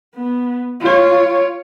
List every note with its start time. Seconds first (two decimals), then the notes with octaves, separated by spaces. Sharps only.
0.15 B3
0.80 F4 C#5